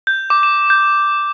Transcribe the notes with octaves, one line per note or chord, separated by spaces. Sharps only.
G6
D6
E7
G6